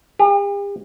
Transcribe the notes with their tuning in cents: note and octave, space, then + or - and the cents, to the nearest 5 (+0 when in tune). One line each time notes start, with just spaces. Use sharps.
G4 +45